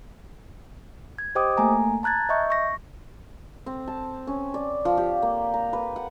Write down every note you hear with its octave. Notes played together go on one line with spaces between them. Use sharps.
G#6
G4 C5 D#5 G5 D6 D#6
A3 A#3 G#5 A#5
A5 A#5 F#6 G#6 A6
D#5 E5 C#6 G6
C#6 A#6
C4
A5
C#4
D5
F3
G4
A#3
A#5
B4
F#5